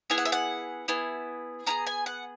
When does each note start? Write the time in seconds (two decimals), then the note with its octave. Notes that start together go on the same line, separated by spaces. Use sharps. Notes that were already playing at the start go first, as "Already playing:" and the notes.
0.10 B3 E4 G#4 G#5
0.18 F#5
0.25 E5
0.32 F#5
0.88 B3 E4 G#4
1.66 B3 E4 G#4 A#5
1.87 G#5
2.06 F#5